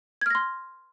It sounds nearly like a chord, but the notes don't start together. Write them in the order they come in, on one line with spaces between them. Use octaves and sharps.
G#6 F6 A#6 C6